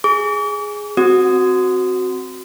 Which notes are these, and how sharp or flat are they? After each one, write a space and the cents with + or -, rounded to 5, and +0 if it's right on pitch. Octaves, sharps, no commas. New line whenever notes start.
G#4 +0 D6 -45
C4 +0 F#4 +0 D#6 -5